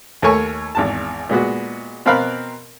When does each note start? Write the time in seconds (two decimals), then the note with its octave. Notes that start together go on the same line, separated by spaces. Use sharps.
0.22 D#2 A3 A#4 C#5 G#5 C#6
0.75 G#1 E2 A5
1.29 A#2 G#3 B3 F#4
2.06 B2 C4 A#4 F5 B5 F#6